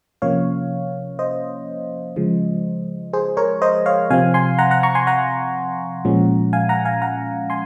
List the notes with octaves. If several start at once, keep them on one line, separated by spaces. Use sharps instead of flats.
C3 F3 A#3 C#4 C#5 F5
C5 D#5
C#3 F3 G#3
G#4 C5
A#4 C#5
C5 D#5
C#5 F5
C3 F3 C4 F5 G#5
G#5 C6
F#5 A#5
F#5 A#5
A#5 C#6
G#5 C6
F#5 A#5
A#2 F3 G#3 C#4
F5 G#5
F#5 A#5
F5 G#5
F#5 A#5
G#5 C6